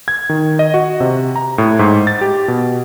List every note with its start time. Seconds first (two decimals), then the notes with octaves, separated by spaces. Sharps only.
0.08 G#6
0.29 D#3
0.59 D#5
0.74 F#4
1.00 C3
1.36 A#5
1.58 A2
1.79 G#2
2.07 A6
2.21 G4
2.48 B2